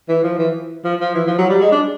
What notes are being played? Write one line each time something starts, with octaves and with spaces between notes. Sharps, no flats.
E3
F3
E3
F3
F3
E3
F3
F#3
G3
G#3
D4